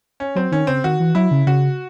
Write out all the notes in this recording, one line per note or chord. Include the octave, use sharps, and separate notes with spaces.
C#4
F#3 C4
D#3 C#4
C#3 C4
D#3 F#4
E3
F#3 E4
C#3
C#3 F#4